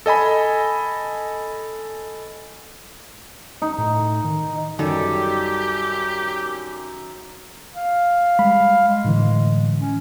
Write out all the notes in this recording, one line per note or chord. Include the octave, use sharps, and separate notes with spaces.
A4 D#5 G#5 B5
D#4
A2
D#3
F#2 D#3 G3 G4 A4
F5
G3 G#3 B5
G#3
A2 D3 E3
C#4